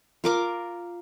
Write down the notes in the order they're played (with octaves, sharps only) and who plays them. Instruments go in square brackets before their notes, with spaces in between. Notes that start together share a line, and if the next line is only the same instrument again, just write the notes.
[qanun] F4 A#4 D6